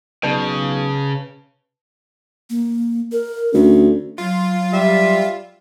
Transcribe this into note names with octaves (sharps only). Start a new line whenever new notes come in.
B1 C#3 B4 A5
A#3
A#4
D2 C#4
F#3 F4
G3 E5